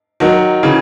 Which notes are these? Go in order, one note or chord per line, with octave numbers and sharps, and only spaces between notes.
D#3 F#3
C#3 E3